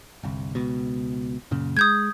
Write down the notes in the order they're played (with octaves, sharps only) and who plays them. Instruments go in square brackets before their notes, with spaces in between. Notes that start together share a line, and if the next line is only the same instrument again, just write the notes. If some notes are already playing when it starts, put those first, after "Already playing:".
[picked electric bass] G1 C2
C#2 B2
F#2 A#2 C#3
[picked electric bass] G#3 [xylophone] D#6 G6 G#6